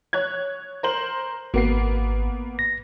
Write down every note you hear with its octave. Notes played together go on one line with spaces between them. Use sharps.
C#5 F#6 G#6
A#4 C5 F#7
G#1 A#3 B3 C7
A#6